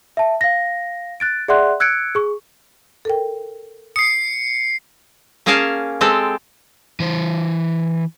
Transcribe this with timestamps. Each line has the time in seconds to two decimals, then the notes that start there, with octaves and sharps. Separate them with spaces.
0.17 E5 A5
0.41 F5 A#6
1.20 F#6 A6 D7
1.48 G#4 D5 E5 F#5 C6 F#6
1.80 E6 F#6 G#6 C#7 D7
2.15 G#4 C#6
3.05 A4 A#4 G5
3.96 D#6 C7 C#7
5.46 A#3 C#4 G#4 A#4 F5 A5
6.01 G#3 C4 G4 A4
7.00 E3 C5